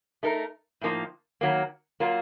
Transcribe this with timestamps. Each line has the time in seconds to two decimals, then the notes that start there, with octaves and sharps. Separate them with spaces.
0.23 A3 D#4 A#4
0.81 A2 F3 A#3 D#4
1.41 D#3 F#3 A#3
2.00 F#3 A#3 F4 A#4